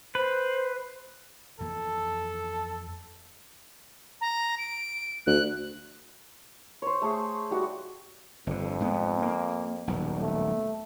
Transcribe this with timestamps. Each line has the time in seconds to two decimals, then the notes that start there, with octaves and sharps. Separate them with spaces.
0.15 B4 C5
1.60 F2 E3 A#3 A4
4.21 A#5
4.58 D7
5.26 D2 F#6
6.82 C5 C#5
7.02 A3 G#4
7.51 G3 F#4 F#5
8.47 G1 F2 D3
8.80 G#2 A#3 B3
9.22 A#3
9.88 D#1 B1
10.21 A3